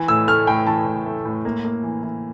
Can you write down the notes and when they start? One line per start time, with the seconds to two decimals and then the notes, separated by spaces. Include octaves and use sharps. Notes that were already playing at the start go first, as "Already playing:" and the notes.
Already playing: E3
0.08 A2 E6
0.28 A3 F6
0.47 A2 G5
0.67 E3 A5
0.86 A2
1.06 A3
1.25 A2
1.45 A#3
1.64 A#3
1.83 E3
2.03 E3